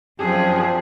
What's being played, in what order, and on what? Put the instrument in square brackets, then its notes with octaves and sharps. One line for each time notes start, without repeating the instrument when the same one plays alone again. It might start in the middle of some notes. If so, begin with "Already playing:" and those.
[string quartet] F#2 F3 [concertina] C4 D4 G4 [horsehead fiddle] G#4